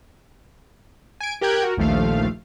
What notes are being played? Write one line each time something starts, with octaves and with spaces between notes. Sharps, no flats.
G#5 D7
G4 A#4 G5 F#6 G#6
F#4 A#4
A#1 D#2 F3 A3 F5